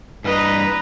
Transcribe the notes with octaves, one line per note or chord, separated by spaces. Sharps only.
G2 B4 D#5 A#5